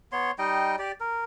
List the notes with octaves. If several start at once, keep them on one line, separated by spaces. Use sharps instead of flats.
B3 C#5 C6
G3 D#4 D#5 G5
G4 D5
A#4